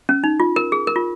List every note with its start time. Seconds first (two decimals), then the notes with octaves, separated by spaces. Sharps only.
0.09 C#4
0.24 D#4
0.40 F4
0.56 A#4
0.72 G#4
0.87 A#4
0.96 F4